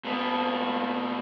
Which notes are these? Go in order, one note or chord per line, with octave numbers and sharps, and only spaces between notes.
A#2 B3